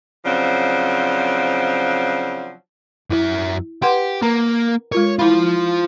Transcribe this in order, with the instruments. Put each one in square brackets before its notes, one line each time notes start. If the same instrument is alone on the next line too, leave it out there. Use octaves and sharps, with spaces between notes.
[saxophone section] C#3 F3 F#3 C4 D4
[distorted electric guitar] F#2 E5 [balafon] E4
[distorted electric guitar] G4 [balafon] B4 F#5 C6
[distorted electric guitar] A#3 [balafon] A#4 A#5
[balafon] G#3 F4 A#4 [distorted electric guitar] C#5
[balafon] E4 B5 [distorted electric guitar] F4 C5